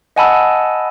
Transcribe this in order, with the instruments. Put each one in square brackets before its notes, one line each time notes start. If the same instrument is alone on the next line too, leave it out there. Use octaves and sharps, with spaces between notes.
[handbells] D#5 F#5 G#5 A5 B5 E6